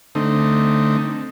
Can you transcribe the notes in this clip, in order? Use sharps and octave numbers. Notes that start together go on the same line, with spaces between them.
D3 A3 C4 D#4